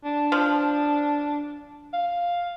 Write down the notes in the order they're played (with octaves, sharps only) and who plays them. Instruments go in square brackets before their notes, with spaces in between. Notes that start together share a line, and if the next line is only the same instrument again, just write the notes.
[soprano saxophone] D4
[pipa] F3
[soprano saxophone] F5